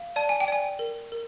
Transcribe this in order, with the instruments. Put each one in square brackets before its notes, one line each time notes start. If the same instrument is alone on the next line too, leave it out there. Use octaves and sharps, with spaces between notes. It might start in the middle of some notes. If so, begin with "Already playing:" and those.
Already playing: [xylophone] F5
D5 A5
G#5
G5
D5 G#5
A#4
A#4